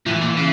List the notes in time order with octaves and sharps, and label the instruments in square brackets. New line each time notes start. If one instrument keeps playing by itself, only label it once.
[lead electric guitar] A2 [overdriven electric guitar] E3
[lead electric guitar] A#2
C#3